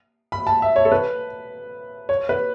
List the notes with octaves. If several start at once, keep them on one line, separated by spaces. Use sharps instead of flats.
B5
A5
E5
C#5
A4
B4
C#5
B4